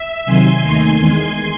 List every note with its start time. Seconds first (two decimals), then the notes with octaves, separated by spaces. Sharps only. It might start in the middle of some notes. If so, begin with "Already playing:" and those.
Already playing: E5
0.25 C3 D#3 F#3 G#5 C6
0.61 D#2 D#3 A3 D#4
0.97 E2 D#3 G#3